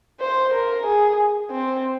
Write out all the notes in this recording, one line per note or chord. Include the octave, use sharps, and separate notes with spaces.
C5
A#4
G#4
C4